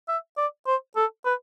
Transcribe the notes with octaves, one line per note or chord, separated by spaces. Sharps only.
E5
D5
C5
A4
B4